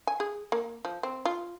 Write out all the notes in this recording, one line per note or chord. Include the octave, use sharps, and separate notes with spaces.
G#5
G#4
A#3
F3
C4
F4